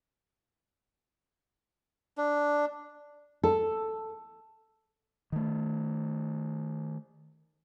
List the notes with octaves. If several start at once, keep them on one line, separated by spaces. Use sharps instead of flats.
D4
A4
D#3 A3